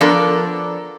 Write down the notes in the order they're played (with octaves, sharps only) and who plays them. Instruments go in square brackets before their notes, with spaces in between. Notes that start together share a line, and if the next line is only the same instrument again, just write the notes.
[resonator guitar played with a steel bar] F3 B3 D4 A4 A#4 D5